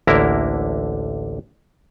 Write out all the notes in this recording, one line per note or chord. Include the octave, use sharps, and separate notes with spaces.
A1 D2 D3 A#3 E4 A#4